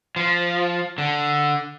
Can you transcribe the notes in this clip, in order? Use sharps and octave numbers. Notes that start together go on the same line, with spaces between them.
F3
D3